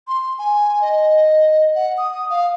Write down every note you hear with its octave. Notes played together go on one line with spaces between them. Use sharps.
C6
G#5
D#5
F#5
D#6
F5